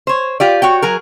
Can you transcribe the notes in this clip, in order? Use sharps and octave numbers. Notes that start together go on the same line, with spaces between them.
C5 C#5
F4 G4 D5
F#4 C#5 G5
F#3 G#4 A#4